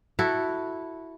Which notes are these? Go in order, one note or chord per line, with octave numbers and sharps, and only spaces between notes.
E4 F#4 A4